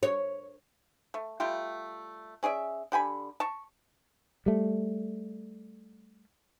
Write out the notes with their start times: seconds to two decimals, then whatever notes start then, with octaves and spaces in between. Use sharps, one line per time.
0.03 C#5
1.14 A3
1.40 G3 A3 F4 G4
2.43 C#4 G#4 D5 E5
2.92 D3 G4 G#5 B5
3.40 A5 C#6
4.46 G3 A3